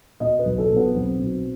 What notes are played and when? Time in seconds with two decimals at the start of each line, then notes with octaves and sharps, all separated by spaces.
0.20 B2 D#5
0.39 B4
0.45 B1
0.58 A4
0.70 B2
0.76 B3
0.95 B1 C4
1.20 B2